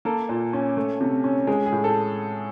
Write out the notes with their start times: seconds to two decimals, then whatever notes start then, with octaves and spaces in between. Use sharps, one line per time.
0.05 A#3 A4
0.29 A#2
0.53 C#4
0.77 A3
1.01 C3
1.24 C#4
1.47 G#3 G#4
1.66 G#4
1.72 A2
1.84 A4